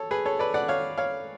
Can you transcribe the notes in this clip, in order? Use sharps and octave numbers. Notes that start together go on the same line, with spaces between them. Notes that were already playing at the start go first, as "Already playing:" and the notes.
Already playing: A4 C#5
G#4 B4
A4 C#5
B4 D5
D5 F#5
C#5 F5
C#5 F5